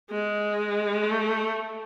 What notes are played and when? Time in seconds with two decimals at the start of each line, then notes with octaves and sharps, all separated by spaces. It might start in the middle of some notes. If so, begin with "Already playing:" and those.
0.10 G#3
1.03 A3